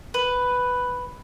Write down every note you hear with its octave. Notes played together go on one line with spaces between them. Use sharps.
B4